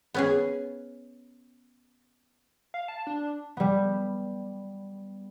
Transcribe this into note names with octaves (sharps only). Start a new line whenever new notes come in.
B3 C#4 G#4
F5
A5
D4
G3 B3